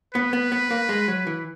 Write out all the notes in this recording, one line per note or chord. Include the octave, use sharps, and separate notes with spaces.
B3 B4
B3
B3
A#3
G#3
F#3
E3